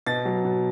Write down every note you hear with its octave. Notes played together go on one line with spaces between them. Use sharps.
B2 A6
F#3
B2